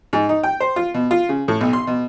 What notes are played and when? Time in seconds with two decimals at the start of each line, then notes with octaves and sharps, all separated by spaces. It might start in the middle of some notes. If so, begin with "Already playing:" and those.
0.13 G#2
0.29 D#4
0.43 G5
0.60 C5
0.76 F4
0.94 B2
1.11 F4
1.29 C#3
1.48 A2
1.61 B1
1.73 C6
1.87 B2